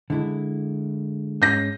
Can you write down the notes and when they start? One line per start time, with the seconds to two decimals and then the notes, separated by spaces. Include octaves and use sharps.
0.10 D3 G#3 E4
1.42 G#2 C#4 G6 A#6